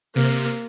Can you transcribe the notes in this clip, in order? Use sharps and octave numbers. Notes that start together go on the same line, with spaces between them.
C3 A#3